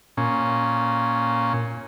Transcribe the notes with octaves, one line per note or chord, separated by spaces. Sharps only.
A#2 C#4